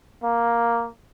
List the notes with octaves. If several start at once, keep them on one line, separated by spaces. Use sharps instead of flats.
A#3